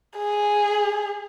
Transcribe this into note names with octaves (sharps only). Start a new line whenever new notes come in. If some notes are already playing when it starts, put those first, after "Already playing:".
G#4